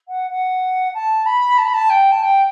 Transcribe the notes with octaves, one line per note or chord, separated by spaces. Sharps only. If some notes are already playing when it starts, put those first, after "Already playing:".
F#5
F#5
A5
B5
A5
B5
A5
G5
A5
G5